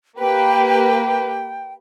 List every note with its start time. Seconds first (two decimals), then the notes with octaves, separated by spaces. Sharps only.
0.19 A#3 G4 B4 G5